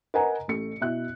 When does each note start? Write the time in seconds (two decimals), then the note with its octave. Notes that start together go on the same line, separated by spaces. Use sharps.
0.14 A#4 B4 D#5 F#5 G#5 A#5
0.48 A1 A3 C#7
0.80 B2 E4 E5 F#6